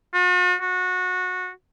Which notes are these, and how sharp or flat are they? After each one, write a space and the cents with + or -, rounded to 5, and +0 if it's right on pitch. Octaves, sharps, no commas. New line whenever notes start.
F#4 -45
F#4 -20